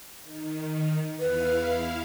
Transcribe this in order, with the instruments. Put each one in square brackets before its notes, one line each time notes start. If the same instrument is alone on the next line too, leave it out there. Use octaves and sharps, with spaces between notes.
[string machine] D#3
[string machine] E2 E4 F5 [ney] B4